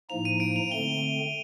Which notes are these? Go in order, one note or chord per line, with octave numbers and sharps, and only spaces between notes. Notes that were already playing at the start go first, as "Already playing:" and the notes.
A2 F3 A#3 D#4 F7
D#7
D7
F7
D3 A3 C4 G7